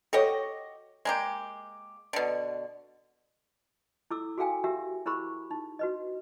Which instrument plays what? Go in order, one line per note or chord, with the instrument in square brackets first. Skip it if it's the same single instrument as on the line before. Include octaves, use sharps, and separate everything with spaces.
[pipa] F#4 G4 D#5 [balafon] A4 C#5
[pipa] G#3 A#3 G4
B2 D3
[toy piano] E4 A4 D6 E6
F#4 G#4 A4 F5 G5 G#5
F#4 G4 A#4 E5
E4 G#4 A#4 C5 B5 C#6
D#4
F#4 B4 D#5